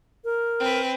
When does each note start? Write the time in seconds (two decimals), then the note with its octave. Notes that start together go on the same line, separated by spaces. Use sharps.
0.24 A#4
0.60 C4 B4